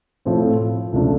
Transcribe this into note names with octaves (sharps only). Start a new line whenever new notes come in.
A2 F3 A3 C4
C#2 C3 F3 A3 D4